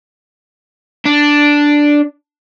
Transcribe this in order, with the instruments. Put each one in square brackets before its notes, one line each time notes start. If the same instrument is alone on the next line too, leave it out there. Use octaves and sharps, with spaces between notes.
[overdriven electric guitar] D4